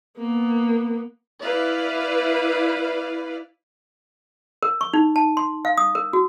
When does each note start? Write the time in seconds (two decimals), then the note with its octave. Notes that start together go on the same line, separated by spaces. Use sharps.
0.18 A#3 B3
1.43 E4 B4 D5 F5
4.63 A#4
4.81 C#6
4.93 D#4
5.16 A5
5.37 C6
5.65 F5
5.77 D#6
5.95 A#4
6.13 F#4